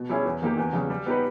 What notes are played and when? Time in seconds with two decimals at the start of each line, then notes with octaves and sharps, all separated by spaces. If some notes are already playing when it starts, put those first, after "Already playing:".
Already playing: B2
0.09 G3 C#4 E4 G#4
0.25 E2
0.42 D#3 A#3 D#4 G4
0.58 E2
0.73 C#3 G3
0.90 G3
1.06 B3 D#4 G4 B4